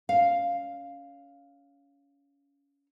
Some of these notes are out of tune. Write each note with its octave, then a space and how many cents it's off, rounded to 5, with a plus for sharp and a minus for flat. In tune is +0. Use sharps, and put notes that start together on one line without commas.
C#4 +25 F5 +0